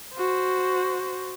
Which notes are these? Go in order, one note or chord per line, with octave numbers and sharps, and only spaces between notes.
F#4 C5